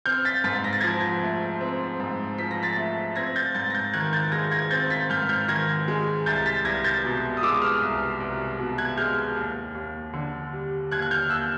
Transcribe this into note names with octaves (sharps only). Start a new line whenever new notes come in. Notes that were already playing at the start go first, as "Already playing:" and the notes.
C4 F6 G6
A6 B6
G#2 A6 B6
A#6
A6
F3 G#6 A#6
A3
C4
G#2
F3 B6
A#6
A6 B6
A3
C4 G#6 A#6
G6 A6
G#2 G6 A6
A#6
G6 A6
D#3 F#6 G#6
G6 A6
G#3 G#6 A#6
G#6 A#6
C4 G6 A6
A6 B6
G#2 F6 G6
F6 G6
D#3 G#6 A#6
G#3
C2 G6 A6
A6 B6
C2 G#6 A#6
G6 A6
B2
D#6
G#3 D6 E6
D#6 F6
C2
C2
B2
F#6 G#6
G#3 F6 G6
D#2
D#2
D3
G3
D#2 F#6 G#6
F#6
F6 G6
D#2 E6 F#6